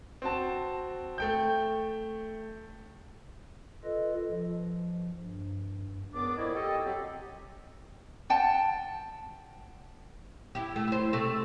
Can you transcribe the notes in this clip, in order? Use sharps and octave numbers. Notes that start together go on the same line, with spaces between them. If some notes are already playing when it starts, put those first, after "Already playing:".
C4 F#4 A5
A3 G5 G6
F4 A4 B4 D#5
F3
G2
C#2 D#3 B3 D4 D6
F2 A#2 E4 G#4 C#5 D#5
G4 A4 D#5
F#3 C4 G4
F#5 G5 A5
E4 G4
A3
E4 C5
C3 A3